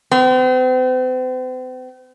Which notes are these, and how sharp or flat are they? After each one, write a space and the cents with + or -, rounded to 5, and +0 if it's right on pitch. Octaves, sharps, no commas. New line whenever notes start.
C4 -45